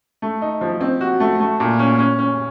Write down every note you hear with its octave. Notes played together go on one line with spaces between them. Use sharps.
A3
D#4
F3
C4
F#4
A3
A3
A#2
C#4
C#4
C#4